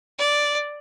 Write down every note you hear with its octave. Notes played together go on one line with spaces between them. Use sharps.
D5